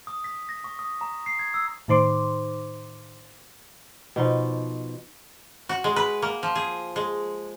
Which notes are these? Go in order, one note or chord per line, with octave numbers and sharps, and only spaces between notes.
D#6
B6
A#6
C#6
D#6
A#5
C7
G#6
E6
A2 D#3 D#4 C5 C6 D6
B2 F3 D#4
F#4
G#3
B4
A#3
F3
G#4
G#3